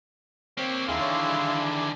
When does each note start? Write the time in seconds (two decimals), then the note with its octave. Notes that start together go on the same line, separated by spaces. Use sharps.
0.57 A#3 C4 G4 C#5
0.88 D#2 D3 D#3 E4 G#4 F5 C6
1.00 E3 D4 G#4 C#5
1.28 G3